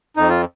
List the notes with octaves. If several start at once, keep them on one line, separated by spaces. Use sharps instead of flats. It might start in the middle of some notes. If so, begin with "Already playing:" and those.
F2 D#4
F4